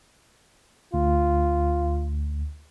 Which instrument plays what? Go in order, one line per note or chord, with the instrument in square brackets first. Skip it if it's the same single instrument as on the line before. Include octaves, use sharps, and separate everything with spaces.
[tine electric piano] D2 [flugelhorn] F4